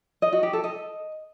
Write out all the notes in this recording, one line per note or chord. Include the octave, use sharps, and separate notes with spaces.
D#5
F#4
G4
A4
D#5